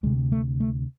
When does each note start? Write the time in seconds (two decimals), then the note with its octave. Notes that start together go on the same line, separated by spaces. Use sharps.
0.03 D2 C3 G#3
0.32 A3
0.60 A3